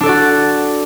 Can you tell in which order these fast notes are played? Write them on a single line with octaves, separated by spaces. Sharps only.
D4 A4 D5 F#4